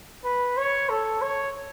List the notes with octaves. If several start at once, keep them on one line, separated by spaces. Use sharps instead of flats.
B4
C#5
A4
C#5